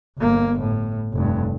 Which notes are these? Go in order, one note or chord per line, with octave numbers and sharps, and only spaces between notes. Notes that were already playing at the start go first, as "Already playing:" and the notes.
G1 A#3
A2
F1 G2